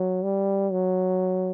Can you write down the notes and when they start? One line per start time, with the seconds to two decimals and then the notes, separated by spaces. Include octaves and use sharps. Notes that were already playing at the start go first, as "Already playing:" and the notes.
Already playing: F#3
0.23 G3
0.72 F#3